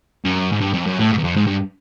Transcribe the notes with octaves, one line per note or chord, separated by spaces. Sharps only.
F#2
G#2
G2
F2
F#2
A2
G#2
E2
F2
G#2
G2